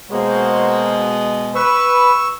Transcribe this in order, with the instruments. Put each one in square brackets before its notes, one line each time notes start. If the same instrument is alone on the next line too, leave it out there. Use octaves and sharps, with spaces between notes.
[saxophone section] B2 G#3 [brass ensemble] A#3 F#4 C5
[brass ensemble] B4 [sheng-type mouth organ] C#6 E6